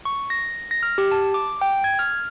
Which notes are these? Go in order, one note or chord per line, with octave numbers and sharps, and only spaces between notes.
C#6
A#6
A#6
F6
G4
A5
D6
G5
G#6
F6